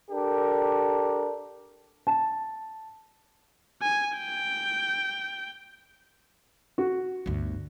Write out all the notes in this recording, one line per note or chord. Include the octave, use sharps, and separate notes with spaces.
D4 G4 A4 A#4
A5
G#5
G5
F#4
G1 D2